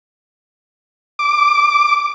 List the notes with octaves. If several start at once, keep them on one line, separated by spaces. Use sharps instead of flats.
D6